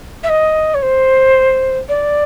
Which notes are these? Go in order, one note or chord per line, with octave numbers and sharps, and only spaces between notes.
E5
D#5
C#5
C5
D5